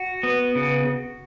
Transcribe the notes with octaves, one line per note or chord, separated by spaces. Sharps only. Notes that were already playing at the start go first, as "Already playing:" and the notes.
Already playing: F#4
B3
C#3